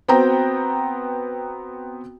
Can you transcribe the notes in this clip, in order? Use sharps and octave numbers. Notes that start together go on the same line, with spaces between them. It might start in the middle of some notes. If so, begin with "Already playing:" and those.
B3 C4 F#4 G5 A#5